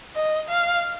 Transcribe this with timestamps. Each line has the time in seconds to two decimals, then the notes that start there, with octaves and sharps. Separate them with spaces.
0.15 D#5
0.49 F5